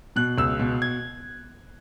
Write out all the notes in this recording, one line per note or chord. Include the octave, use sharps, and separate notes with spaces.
B2 F#6
C#2 E6
B2
G#6